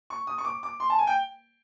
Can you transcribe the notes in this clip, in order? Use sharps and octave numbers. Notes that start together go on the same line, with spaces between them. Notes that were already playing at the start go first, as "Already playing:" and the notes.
C#6
D#6
C#6
D6
D6
C6
A5
G#5
G5